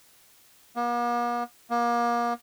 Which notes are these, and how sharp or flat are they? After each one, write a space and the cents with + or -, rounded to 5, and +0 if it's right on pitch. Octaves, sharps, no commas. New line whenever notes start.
A#3 +45
A#3 +30